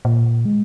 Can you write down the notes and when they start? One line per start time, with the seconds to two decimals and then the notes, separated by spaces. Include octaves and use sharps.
0.05 A#2
0.45 G#3